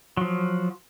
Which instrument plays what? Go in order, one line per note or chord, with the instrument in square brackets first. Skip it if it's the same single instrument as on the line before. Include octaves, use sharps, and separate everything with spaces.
[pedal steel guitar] F3 F#3